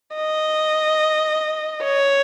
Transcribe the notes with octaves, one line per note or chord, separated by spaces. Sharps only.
D#5
C#5